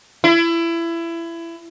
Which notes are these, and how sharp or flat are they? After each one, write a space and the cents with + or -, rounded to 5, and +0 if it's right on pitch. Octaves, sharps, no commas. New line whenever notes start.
E4 +25